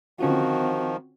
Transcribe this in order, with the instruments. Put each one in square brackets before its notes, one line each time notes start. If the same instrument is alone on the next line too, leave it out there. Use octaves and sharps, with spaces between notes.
[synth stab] D3 C#4 F4 [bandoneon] D#3 F3 [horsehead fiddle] C4 F#4